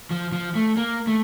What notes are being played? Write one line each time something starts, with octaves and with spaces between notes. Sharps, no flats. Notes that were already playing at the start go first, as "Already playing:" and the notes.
F3
F3
A3
A#3
A3